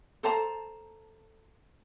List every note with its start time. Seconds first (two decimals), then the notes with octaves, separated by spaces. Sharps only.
0.23 A4 C5 A5 A#5